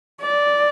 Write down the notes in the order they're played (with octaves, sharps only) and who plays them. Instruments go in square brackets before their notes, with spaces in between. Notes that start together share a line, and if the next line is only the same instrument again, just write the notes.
[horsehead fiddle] D5